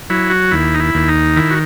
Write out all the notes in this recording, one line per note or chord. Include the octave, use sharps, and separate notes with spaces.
F#3 E4
F#4
D#2 E4
D#4
E4
D#2
D#4
D#3 E4
F#4